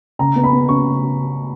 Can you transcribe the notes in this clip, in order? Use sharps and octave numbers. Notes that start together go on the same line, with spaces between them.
C#3 A#5
B3
B5
B3
C#3 C#6